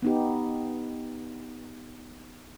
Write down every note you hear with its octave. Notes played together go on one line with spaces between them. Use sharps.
B3 D#4 G4